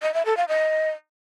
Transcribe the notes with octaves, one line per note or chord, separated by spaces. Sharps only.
D#5
E5
A4
F5
D#5